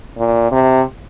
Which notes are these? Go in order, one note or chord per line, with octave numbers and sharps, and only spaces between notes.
A#2
C3